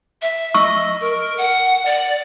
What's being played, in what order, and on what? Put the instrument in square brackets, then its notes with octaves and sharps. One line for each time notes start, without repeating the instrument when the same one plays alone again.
[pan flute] E5
[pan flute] D#5 [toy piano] C#6 E6
[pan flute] A#4
F#5
D5